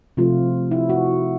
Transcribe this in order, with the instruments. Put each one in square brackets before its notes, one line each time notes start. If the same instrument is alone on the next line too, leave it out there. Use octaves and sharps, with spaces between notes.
[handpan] C3 F3 A3 F4
E4
F#4